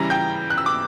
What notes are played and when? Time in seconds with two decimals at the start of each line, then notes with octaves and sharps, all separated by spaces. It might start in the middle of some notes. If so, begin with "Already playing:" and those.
Already playing: C#3 E3 G3 A#5 A#6
0.10 G5 G6
0.50 F#6
0.58 E6
0.66 D6